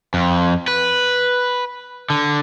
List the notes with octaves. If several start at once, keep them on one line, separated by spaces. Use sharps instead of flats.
F2
B4
D3